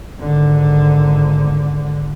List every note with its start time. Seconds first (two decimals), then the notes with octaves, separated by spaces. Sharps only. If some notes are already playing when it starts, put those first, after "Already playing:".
0.20 G#1 D3